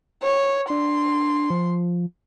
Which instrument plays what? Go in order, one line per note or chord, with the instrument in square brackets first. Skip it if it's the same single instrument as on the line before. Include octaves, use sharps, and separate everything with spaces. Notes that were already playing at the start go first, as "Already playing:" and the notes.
[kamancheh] C#5
[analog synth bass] D4 [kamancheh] C6
[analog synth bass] F3